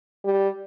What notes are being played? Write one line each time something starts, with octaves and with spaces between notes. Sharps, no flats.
G3